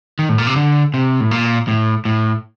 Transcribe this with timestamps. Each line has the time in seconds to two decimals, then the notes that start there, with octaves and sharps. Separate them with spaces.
0.19 D#3
0.29 A2
0.38 A#2
0.47 C3
0.56 D3
0.94 C3
1.20 A2
1.31 A#2
1.68 A2
2.05 A2